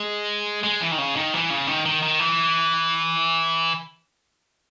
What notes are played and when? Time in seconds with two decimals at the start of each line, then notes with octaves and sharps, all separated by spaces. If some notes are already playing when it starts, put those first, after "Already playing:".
Already playing: G#3
0.63 G#3
0.81 E3
0.92 D#3
0.98 C#3
1.16 D#3
1.34 E3
1.50 C#3
1.67 D#3
1.86 D#3
2.02 D#3
2.19 E3